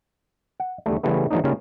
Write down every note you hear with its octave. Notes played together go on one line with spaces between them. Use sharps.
F#5
E2 D3 G3 A3
C#3 E3 G3 A3 B3
E3 F#3 G#3 A#3 D4 D#4
C#3 G3 A#3 C#4 D#4 F4